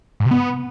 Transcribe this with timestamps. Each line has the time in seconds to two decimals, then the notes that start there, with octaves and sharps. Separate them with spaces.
0.20 G#2
0.26 C3
0.31 B3